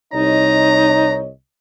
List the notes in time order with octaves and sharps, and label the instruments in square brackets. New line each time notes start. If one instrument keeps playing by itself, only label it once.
[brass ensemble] C2 C#5 D#5 [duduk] D#4 [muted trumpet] A#5